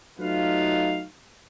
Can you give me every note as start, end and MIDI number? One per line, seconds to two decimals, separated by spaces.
0.20 1.03 54
0.20 1.03 57
0.20 1.03 63
0.20 1.03 65
0.20 1.03 71
0.20 1.03 77